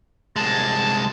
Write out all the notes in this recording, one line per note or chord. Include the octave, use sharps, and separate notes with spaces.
C2 G#3 A5